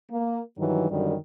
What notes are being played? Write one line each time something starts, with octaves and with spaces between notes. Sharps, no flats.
A#3
G2 D#3 E3 F#3
F#2 D3 D#3 G3